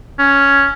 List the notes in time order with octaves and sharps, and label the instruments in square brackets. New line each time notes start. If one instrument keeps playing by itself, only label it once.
[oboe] C#4